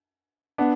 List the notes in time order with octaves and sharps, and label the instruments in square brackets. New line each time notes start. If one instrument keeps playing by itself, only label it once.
[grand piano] B3 D4